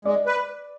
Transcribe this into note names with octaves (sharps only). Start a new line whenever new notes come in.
G#3 D5
B4